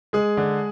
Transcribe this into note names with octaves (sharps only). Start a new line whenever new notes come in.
G#3 G#4
D3